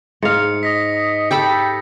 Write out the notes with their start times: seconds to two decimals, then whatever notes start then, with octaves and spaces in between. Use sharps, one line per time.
0.22 G#2 F5 C#7
0.63 D#5 D#6 A#6 B6
1.31 G4 A4 G5 B5